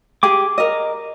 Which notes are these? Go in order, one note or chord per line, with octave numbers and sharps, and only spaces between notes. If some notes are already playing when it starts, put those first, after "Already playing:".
G4 G#4 D6
A#4 D#5